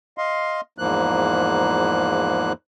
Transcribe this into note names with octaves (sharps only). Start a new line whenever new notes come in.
D#5 F5 C6
E2 G#2 F3 A#3 F#6